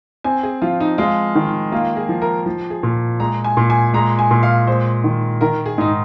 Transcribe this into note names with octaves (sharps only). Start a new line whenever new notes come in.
C4 G#5
G#4
F3 F4
D#4
G#3 F4
D#3
A#3 F4
G#4
F3
A#4
F3
G#4
A#2
G#3 A#5
G#5
A#2
G#5
G#3 A#5
G#5
A#2
F5
G#3 C5
D#3
D#3 A#4
G#4
G#2 D#4